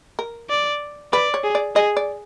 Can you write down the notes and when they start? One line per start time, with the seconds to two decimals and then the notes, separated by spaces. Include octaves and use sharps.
0.19 A#4
0.50 D5
1.13 B4 D5
1.34 C#5
1.44 G#4
1.55 D5
1.75 G#4 D#5
1.97 D5